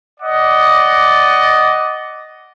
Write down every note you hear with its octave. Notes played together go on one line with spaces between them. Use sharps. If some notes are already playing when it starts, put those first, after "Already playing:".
D5 D#5 F#5 D6